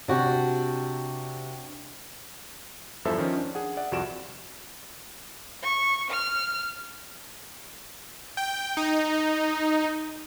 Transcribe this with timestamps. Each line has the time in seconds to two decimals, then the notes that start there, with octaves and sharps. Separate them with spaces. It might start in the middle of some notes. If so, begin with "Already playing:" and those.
0.08 C3 D4 F#4 G4
3.05 E2 G2 F3 A4 C5 E5
3.18 D#3 F3 C#4
3.37 D4
3.55 G#4 F#5
3.77 D5 E5 F#5
3.92 C2 F2 G3 F#4 D7 E7
5.63 C#6
6.10 F6
8.37 G5
8.77 D#4